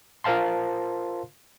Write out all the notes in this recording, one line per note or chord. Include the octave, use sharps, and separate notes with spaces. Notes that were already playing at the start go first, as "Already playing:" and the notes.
F4 A#4 C5 F5 A5 C6